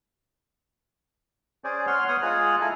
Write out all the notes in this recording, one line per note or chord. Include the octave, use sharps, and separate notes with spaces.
C#4 G#4 C5 D5
C#5 F#5 C6 F6
B3 C#5 D#6 F6 F#6
G#3 F4 G#4 A#5 F#6
E4 F4 G#4 A4 G#5 A#5